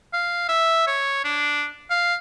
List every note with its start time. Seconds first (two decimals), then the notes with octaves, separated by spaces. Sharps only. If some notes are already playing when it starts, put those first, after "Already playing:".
0.13 F5
0.49 E5
0.87 C#5
1.24 D4
1.90 F5